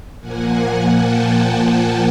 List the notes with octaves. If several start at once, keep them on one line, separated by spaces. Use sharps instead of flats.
A#2 F3 A#3 F#5 G#5
G5 A5